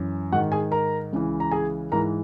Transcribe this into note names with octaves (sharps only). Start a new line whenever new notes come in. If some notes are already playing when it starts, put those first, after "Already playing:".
Already playing: F#2 E3
G#2 D#3 F#4 F#5
G#4 G#5
A#4 A#5
C#2 C#3 E3
A#5
G#4 G#5
G#2 E3 A#4 A#5